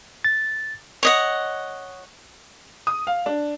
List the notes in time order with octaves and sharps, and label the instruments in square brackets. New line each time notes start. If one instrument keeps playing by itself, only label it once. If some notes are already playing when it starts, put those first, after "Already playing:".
[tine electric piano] A6
[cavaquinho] C#5 D#5 F#5
[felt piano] D#6
F5
D4